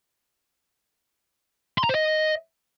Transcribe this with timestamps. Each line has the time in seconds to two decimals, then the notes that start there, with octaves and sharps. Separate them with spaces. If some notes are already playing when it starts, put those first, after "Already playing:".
1.78 C6
1.84 A#5
1.89 C5
1.95 D#5